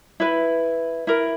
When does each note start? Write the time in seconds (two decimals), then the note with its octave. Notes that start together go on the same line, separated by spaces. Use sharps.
0.20 E4 B4
1.07 E4 A#4